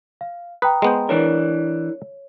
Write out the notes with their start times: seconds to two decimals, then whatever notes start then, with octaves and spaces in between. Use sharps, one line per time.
0.21 F5
0.62 B4 G5 A#5 D#6
0.82 G#3 B3 C5
1.09 E3 D4 A#4 C#5